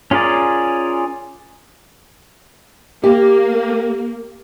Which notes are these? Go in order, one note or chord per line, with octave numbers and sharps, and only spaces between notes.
C#4 F4 G#4 A#4 D5
A#3 G4